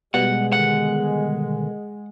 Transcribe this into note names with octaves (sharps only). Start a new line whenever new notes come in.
B2 G3 G#3 B3 F#5
D3 D#3 F#5